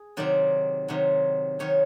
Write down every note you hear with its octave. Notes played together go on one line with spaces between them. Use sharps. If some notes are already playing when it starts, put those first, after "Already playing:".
Already playing: G#4
C3 D#3 F#3 D5
C3 D#3 F#3
C3 D#3 F#3 C#5